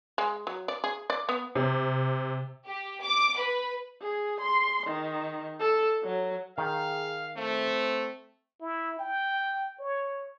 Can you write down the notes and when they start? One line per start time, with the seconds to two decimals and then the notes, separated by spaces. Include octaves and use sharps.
0.18 G#3
0.47 F#3
0.68 D5
0.84 G#4
1.10 D5
1.29 B3
1.55 C3
2.65 G4
3.02 D6
3.37 B4
4.01 G#4
4.41 C6
4.87 D#3
5.59 A4
6.03 F#3
6.58 D#3 G#4 F5
7.37 A3 C4
8.61 E4
8.99 G5
9.79 C#5